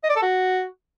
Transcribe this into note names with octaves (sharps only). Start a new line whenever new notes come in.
D#5
D5
A4
F#4